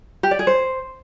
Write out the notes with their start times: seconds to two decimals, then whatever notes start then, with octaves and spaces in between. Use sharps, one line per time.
0.23 G4
0.31 D5
0.39 G#4
0.47 C5